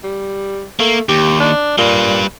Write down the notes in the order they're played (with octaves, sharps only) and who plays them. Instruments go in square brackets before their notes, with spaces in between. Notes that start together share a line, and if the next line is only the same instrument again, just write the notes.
[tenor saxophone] G3
[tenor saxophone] A3 [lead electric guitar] A#3
[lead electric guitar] D#2 [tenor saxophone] G4
[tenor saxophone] D4
[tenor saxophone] A#2 [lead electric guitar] G3 B4